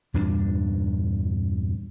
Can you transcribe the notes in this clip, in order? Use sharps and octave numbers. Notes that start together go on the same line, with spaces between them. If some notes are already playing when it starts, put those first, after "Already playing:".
E2 G2 A#2 D4